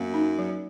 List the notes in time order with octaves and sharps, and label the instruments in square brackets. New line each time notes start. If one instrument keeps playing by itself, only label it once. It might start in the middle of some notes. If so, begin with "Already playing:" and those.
Already playing: [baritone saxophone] F#2 [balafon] A#3
[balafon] D#4
F#3